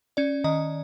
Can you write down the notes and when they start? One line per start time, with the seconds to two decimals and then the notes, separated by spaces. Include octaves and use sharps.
0.17 C#4 D5
0.44 D#3 D#5